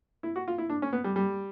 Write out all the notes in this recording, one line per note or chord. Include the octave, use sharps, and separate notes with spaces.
E4
F#4
F4
E4
D4
C#4
B3
G3
G3